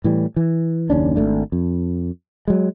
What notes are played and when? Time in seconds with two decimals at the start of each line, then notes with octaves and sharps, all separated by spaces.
0.04 A2 E3 G3
0.36 E3
0.90 F#1 D#2 C#4 D4
1.16 G#1 G2 A3 D4
1.52 F2
2.48 F#3 G#3